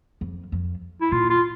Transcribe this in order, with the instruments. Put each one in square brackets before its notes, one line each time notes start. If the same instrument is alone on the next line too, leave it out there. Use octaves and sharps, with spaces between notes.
[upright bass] F2
F2
[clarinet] E4
[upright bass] A#2 [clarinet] F4
[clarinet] F4